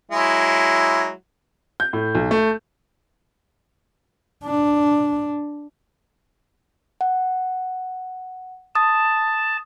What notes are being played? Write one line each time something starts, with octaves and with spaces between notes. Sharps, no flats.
F#3 G#3 E4
G6
A2
B1
A3
D4
F#5
A5 D#6